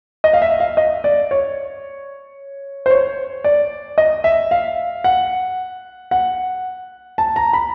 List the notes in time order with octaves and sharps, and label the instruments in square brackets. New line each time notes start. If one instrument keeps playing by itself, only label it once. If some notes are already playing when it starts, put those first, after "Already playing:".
[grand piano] D#5
F5
E5
F5
D#5
D5
C#5
C5
C#5
D5
D#5
E5
F5
F#5
F#5
A5
A#5
B5